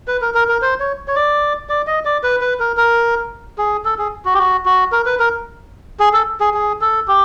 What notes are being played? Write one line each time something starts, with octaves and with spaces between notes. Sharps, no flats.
B4
A#4
A#4
A#4
C5
C#5
C#5
D5
D5
D#5
D5
B4
B4
A#4
A#4
G#4
A4
G#4
F#4
G4
F#4
F#4
A#4
B4
A#4
G#4
A4
G#4
G#4
A4
G4